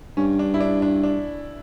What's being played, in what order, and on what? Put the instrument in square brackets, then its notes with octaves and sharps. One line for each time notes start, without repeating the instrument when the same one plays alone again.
[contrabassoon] G2 [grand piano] C#4
[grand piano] D4
E4
D4
D4
D4